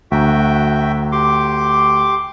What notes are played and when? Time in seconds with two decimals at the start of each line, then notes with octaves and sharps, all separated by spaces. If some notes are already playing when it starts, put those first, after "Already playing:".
0.11 D2 F#4 E5 G5 A#5
1.12 G4 C6 D6